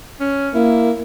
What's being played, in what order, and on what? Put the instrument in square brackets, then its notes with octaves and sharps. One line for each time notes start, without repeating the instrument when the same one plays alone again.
[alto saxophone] C#4
[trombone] A#3 [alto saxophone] E4